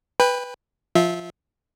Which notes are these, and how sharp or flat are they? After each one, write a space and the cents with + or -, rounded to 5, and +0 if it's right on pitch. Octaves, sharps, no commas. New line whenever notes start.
B4 +0 G5 +30
F3 +0 F4 +0 E5 -20